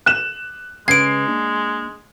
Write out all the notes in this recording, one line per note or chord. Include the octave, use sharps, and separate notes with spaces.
F#6 E7
C#3 G#3 C#4 B4 G#6 C7 D7
A#3 D4